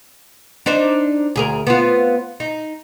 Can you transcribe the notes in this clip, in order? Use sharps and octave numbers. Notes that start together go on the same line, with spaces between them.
D4 D#4 C5
D2 G#4 A#4
B3 C4 F4
D#4